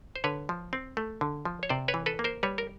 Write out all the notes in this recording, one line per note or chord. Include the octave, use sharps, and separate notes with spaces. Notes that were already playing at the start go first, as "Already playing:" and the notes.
C5
D3 B4 C#5
F3
C4
A3
D3
F3
C#5
C3 C5 D5
B4 C#5
E3
A4 B4
A#3
A#4 C5
G3 B4 C#5
A#4